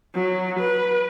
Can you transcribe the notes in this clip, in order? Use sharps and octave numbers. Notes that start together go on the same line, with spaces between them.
F#3
B4